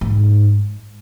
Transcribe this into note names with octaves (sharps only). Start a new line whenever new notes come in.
G#2